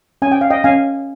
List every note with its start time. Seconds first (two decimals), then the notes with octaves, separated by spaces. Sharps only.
0.22 C#4 G#5
0.32 G5
0.41 F5
0.50 D#5 G5
0.64 C#4 F5 G#5